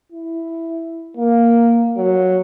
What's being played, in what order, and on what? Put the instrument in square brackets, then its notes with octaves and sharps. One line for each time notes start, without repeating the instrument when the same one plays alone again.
[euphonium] E4
A#3
F#3